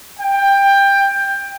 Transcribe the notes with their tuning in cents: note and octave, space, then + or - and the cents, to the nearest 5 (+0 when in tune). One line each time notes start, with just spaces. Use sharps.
G5 +15